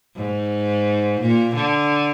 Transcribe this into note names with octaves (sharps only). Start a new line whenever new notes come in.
G#2
A#2
D3